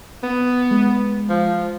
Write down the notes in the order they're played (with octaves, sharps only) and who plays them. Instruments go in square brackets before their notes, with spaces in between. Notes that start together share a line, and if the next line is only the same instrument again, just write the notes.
[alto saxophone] B3
[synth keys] G#3
[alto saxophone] F3